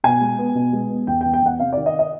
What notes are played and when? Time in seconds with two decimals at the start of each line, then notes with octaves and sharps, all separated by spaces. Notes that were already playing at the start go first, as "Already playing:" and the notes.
0.04 B2 G#5
0.20 G#3
0.39 B3
0.55 B2
0.73 G#3
0.90 B3
1.07 E2 G5
1.21 G5
1.25 E2
1.33 G5
1.42 E2 F#5
1.60 C3 F5
1.73 D5
1.77 D#3
1.86 D#5
1.99 D#5